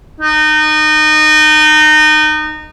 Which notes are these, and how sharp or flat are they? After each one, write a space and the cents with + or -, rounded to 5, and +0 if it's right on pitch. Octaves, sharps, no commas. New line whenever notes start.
D#4 -25